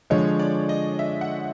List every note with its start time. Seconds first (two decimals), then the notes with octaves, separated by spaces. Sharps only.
0.10 D3 F3 G#3 C#5
0.39 D5
0.69 D#5
0.99 E5
1.21 F#5